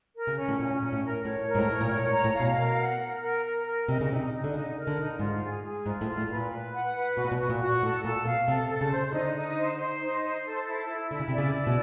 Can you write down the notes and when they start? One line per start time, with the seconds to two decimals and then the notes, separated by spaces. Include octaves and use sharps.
0.16 A#4
0.27 C#3
0.38 C#4
0.48 A2
0.60 A#2 C#4
0.81 A#2 C#4
0.92 A2
1.04 A#4
1.25 A2 C#5
1.48 A#4
1.55 G#2
1.58 A2
1.70 C#5
1.81 A#2
1.90 A2 C#5
2.08 G#2
2.13 A#5
2.24 A2
2.34 F5
2.40 B2
2.56 A#4
2.78 F#5
3.01 A#4
3.22 A#4
3.45 A#4
3.66 A#4
3.88 C3 D#4
4.01 C#3
4.11 C3 D#4
4.32 D#4
4.44 D3
4.53 C#3 D#4
4.75 A#4
4.87 D3
4.97 D#4
5.19 G#2 F4
5.42 G#4
5.64 G#4
5.85 G#2 F4
6.01 A2
6.08 F4
6.18 A2
6.29 B4
6.35 A#2
6.51 B4
6.73 F#5
6.95 B4
7.16 B2 F#4
7.24 A#2
7.32 B2
7.38 F#4
7.49 A#2
7.60 F#4
7.83 A2 A4
8.04 A#2 A4
8.25 B2 F5
8.47 C3 A4
8.70 A4
8.81 C#3
8.91 C5
9.13 D3 D#4
9.36 D#4
9.58 C5
9.80 C5
10.01 D#4
10.24 C5
10.45 A4
10.66 E4
10.88 E4
11.11 D3 E4
11.20 C#3
11.28 C3
11.33 D5
11.38 C#3
11.54 E4
11.67 B2